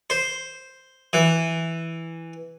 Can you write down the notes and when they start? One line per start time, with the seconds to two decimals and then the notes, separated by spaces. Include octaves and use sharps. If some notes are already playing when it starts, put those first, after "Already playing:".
0.10 C5
1.13 E3